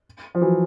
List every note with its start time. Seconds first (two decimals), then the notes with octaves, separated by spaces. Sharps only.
0.35 F3
0.41 E3 F#3